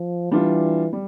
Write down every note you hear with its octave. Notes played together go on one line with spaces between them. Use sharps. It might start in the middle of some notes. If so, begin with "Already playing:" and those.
Already playing: F3
E3 G3 D4 F4
G3